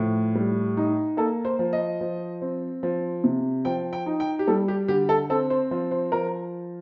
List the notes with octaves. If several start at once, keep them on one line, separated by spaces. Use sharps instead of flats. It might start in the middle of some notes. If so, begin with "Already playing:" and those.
Already playing: A2 F3
G3
D#4
A#3 A4
C5
F3
D#5
F3
C4
F3
C3
F3 G5
G5
D#4
G5
G4
G3 A4
G4
D3 G4
A4
C4 A4
C5
F3 C5
C5
F3 A#4